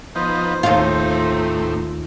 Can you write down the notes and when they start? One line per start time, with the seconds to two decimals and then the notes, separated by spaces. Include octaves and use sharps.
0.15 F3 B3 D#4 C5
0.63 D#2 A2 A3 C4 D#4 F4